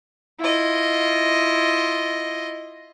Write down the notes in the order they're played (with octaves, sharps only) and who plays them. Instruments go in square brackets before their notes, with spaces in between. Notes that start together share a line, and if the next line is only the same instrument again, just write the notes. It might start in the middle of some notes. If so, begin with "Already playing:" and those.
[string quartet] E4 F4 D#5